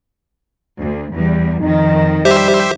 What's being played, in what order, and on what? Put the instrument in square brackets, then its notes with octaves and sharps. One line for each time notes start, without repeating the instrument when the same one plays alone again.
[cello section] D2
E2 G3
[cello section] F2 D#3 [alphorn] D#4
[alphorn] G3 [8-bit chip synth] G4 C5 E5